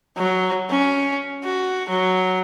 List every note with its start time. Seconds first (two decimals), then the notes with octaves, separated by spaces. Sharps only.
0.17 F#3
0.70 C#4
1.44 F#4
1.89 F#3